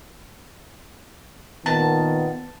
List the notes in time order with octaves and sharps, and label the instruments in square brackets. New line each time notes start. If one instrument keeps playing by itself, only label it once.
[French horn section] A#2 D#3 B3 [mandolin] A5